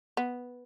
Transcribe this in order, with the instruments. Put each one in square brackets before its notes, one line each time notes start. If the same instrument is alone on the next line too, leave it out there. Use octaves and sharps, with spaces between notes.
[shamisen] B3